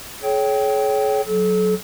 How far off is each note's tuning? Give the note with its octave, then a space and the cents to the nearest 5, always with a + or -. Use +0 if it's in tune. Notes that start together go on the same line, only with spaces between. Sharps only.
G#4 +40 C#5 +0 G5 -10
F#3 +0 A4 -35